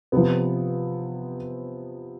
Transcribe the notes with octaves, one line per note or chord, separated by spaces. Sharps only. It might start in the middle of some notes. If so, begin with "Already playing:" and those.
C3 F3 B3